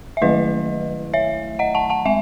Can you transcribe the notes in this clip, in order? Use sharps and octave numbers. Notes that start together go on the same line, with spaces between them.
E5
D#3 F#3 A3 E4 B4 D#5
C#5 E5
D#5 F#5
F#5 A5
F#5 A5
G#3 E5 G#5